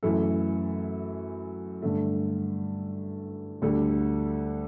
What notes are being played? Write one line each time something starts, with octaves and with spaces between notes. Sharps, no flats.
F#2 E3 A3 E4 A4
G2 D3 A3
D2 D3 G3 D4 A4